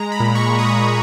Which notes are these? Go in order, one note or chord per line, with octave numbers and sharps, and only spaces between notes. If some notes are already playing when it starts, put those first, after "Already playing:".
Already playing: G#3 A#5
B5
A#2
C#6
G#3
D#6
A#2